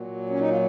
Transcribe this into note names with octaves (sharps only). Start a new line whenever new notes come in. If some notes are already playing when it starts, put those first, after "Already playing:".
Already playing: A#2 F#3
C#4
D#4
F4